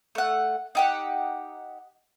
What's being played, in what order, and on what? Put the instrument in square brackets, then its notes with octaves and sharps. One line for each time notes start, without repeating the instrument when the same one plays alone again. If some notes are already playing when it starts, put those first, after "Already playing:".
[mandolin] A3 F#5
D#4 G4 F#5